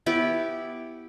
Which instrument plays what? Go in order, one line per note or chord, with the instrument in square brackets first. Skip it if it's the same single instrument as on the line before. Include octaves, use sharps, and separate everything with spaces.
[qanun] B3 E4 G4